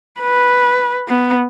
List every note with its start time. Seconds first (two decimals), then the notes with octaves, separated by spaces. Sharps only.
0.20 B4
1.08 B3